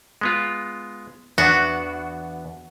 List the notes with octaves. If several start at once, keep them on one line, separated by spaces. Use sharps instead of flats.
G#3 B3 F4
E2 B3 D4 F#4